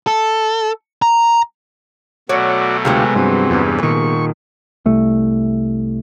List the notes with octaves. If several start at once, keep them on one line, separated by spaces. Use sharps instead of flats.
A4
A#5
B2 F#3 A3 F#4 C#5 D5
D2 C3 G#3 B3 F4 G4
G2 E3 F#3 C4
E2 G2
A#2 D#3 C#6
C2 A3